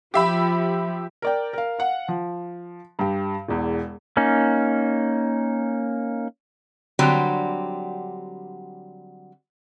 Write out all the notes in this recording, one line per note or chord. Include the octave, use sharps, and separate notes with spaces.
F3 G4 E5 B5
A#4 D5 G5
A#4 F5
F5 F#5
F3
G2 G4
E1 E2
A#3 C#4 D#4
D3 F#3 G3 C4 G4